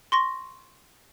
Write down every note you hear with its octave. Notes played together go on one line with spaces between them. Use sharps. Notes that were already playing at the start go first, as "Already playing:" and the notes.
C6 C#6 A#6